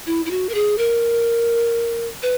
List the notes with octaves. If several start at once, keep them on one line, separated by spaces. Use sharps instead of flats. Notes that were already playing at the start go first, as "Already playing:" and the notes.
E4
E4
F#4
A#4
G#4
A#4
B4